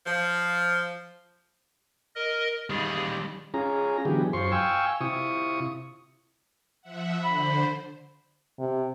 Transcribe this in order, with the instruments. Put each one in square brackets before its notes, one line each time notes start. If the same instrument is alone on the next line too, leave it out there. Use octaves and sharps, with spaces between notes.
[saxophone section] F3
[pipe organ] A#4 D#5
[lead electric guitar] D#3 G3 [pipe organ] G#4
[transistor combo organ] C#4 F4 G#4 A#5
D3 E3 F#3 B3 G4 G#4
F#2 F4 C5 C6 C#6
F5 G5 G#5 C#6 E6
C3 E4 F4 C#6 D#6
[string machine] F3 E5 F#5
[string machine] D3 C5 [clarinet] B5
[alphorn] C3